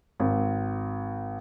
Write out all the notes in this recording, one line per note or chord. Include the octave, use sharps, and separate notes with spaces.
G#1